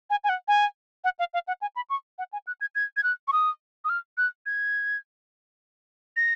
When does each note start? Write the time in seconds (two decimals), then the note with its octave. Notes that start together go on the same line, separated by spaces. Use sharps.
0.10 G#5
0.24 G#5
0.29 F#5
0.48 G#5
1.04 F#5
1.19 F5
1.34 F5
1.47 F#5
1.61 G#5
1.76 B5
1.90 C#6
2.18 F#5
2.33 G#5
2.47 F#6
2.61 G#6
2.75 G#6
2.97 G#6
3.03 F#6
3.28 C#6
3.32 D#6
3.84 D#6
3.89 F6
4.18 F#6
4.46 G#6
6.16 A#6